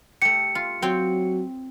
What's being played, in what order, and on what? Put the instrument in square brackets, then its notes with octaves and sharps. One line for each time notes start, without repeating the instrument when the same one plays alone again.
[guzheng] A3 G4 [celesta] C#7
[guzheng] F4
[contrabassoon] F#3 [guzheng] C4 C#5 G5